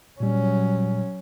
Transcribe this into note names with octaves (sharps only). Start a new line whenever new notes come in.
A#2 F#3 G3 C#4